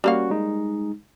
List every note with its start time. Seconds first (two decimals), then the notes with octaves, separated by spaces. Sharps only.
0.04 G3 A#3 C#4 F#4 F5
0.30 G#3 D#4